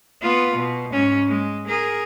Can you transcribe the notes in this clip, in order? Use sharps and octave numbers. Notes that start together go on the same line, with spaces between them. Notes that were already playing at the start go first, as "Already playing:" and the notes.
B3 F4
B2
G#2 C#4
G#3
G#4 A#4